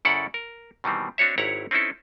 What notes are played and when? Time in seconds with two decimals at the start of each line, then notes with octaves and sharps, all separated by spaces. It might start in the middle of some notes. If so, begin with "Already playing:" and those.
0.05 F#2 C#3 E4 A4 D5 F#5
0.34 A#4
0.84 B2 D#3 E3 G3 C4
1.18 C4 D4 F#4 C#5 E5
1.38 G#1 E4 G4 C#5 F#5 A#5
1.71 C4 C#4 D#4 E4 A4